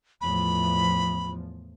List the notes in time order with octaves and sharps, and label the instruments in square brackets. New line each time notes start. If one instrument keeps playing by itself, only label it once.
[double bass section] E2 A2 F3 [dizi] B5